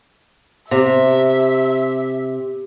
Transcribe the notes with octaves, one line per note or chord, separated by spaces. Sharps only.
C3 E5